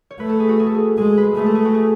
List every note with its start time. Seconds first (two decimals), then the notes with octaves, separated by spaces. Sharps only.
0.11 C#5
0.20 A3 B4
0.29 A4
0.40 G#4
0.49 F#4
0.60 G#4
0.67 A4
0.75 G#4
0.98 G#3 G#4
1.18 B4
1.36 A3 G#4
1.46 A4
1.55 G#4
1.65 F#4
1.75 G#4